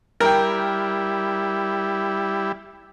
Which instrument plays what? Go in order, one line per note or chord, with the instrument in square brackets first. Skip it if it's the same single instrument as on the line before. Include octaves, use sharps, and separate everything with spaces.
[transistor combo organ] G3 E4 [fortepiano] A#4 G5